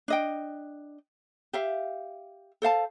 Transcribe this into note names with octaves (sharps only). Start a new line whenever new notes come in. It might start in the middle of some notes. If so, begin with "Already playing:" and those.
D4 D#5 G5
G4 E5 F5
A4 C5 F5 A5